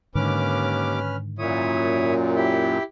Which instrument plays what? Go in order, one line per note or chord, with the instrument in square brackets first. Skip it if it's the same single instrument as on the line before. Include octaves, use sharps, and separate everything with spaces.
[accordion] D#2 D6 [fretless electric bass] G#2 D3 D#3 [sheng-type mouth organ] C#4 B4 F6
[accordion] F#2 A#2 [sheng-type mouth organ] E4 C#5 D#6
[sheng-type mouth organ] E4 G4